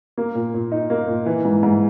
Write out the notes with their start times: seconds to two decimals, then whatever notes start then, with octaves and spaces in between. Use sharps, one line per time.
0.18 A#3
0.35 A#2
0.54 A#2
0.72 D#4
0.90 A#3
1.08 A#2
1.26 E3
1.45 G#2
1.63 G#2